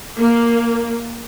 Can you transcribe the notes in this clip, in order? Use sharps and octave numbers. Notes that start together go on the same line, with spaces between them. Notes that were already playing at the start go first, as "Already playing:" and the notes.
A#3